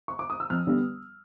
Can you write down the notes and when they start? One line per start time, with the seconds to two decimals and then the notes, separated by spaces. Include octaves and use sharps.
0.08 C#6
0.19 D6
0.30 D#6
0.40 E6
0.50 F2 F6
0.67 D3 G3 B3